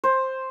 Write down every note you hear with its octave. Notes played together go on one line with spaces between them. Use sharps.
C5